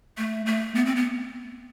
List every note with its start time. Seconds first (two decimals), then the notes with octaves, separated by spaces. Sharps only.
0.18 A3
0.46 A3
0.75 B3
0.86 C4
0.96 B3